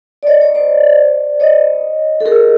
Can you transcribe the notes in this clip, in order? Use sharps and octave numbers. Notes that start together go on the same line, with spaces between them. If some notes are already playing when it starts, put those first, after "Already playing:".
D5
C#5 D#5
C#5 D#5
C5 D5
C#5 D#5
A4
G#4 A#4